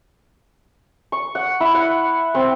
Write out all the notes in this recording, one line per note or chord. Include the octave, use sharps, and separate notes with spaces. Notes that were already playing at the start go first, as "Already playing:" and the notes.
C#6
F#5
E4
F#5
C4